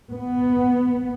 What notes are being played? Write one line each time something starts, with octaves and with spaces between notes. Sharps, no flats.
B3